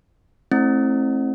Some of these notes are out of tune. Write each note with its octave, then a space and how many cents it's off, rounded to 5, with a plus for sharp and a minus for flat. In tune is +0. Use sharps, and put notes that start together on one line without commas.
A3 -10 C4 +30 E4 +0